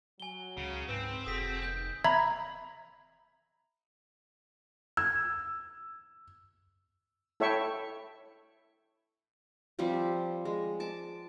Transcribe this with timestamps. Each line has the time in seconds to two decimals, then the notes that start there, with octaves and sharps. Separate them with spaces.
0.20 F#3 G#5 G7
0.57 C#2 C#3
0.89 G#2 C4 B4
1.26 F1 F#4 G#4 A4 D#6 B6
1.63 B2 D#3 G6
2.04 E5 A#5 B5 G#6
4.97 E6 G#6
7.40 E4 A4 C#5 E5 G5 C#6
9.79 F3 G3 C4 G4
10.45 G#3
10.80 A5 D6